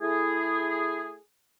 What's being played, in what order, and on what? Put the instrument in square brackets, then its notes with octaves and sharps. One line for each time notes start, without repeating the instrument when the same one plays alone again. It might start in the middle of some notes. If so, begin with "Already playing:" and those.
[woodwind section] A3 E4 G#4